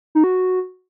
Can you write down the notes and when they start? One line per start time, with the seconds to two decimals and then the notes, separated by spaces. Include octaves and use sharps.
0.15 D#4
0.24 F#4